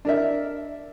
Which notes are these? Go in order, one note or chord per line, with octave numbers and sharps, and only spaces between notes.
D4 A#4 E5